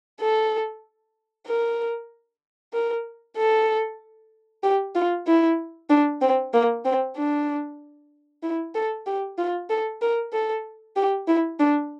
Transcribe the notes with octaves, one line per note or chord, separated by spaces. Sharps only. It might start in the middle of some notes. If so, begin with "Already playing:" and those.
A4
A#4
A#4
A4
G4
F4
E4
D4
C4
A#3
C4
D4
E4
A4
G4
F4
A4
A#4
A4
G4
E4
D4